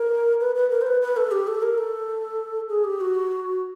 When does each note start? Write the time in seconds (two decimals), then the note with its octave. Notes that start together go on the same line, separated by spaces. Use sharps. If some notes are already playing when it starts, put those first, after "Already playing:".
Already playing: A#4
0.40 B4
0.55 B4
0.70 A#4
0.81 C5
0.87 B4
1.02 B4
1.17 A4
1.31 G4
1.47 A4
1.62 A#4
1.78 A4
2.69 G#4
2.84 G4
3.01 F#4